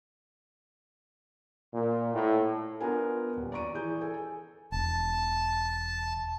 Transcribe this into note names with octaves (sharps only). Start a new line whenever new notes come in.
A#2
A2
B3 D4 F4 A#4 G#5
D#1
D5 A#5 C#6 D7 D#7
E3 G#4 G6
A4 G#5
E1 A5